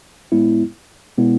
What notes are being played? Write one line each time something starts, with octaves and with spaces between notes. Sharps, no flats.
A2 G#3 B3 E4
B2 G#3 B3 E4